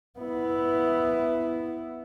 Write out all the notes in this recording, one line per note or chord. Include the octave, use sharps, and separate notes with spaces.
B3 E4